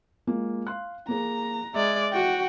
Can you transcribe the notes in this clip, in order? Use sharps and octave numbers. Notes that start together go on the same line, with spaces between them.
G#3 A#3 F4
F5 C6 F#6
A#3 G#4 A#5
G#3 D5 E5
F#4 F#5 G5